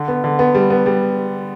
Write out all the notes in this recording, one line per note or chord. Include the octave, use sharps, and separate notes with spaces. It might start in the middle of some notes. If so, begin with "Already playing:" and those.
Already playing: D3
B3
D3
B3
G3
B3
G3